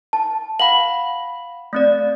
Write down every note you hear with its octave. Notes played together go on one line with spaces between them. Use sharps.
A5
F5 F#5 B5 F#7
A3 C4 D5